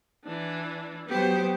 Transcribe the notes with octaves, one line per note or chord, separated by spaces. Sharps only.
E3 D4
F#3 B3 G4 C5